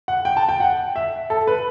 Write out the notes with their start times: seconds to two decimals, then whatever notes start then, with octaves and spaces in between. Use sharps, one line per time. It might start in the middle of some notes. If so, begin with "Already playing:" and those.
0.08 F#5
0.25 G5
0.37 A5
0.49 G5
0.60 F#5
0.96 E5
1.30 A4
1.47 B4